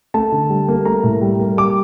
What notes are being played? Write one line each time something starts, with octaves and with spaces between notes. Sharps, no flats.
A3 A5
D3
G3
A#3
A3 A#5
A2
G3
A#3
G3 D6